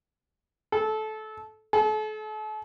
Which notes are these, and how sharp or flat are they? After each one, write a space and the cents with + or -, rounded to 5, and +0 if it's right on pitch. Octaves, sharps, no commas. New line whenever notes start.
A4 -20
A4 -40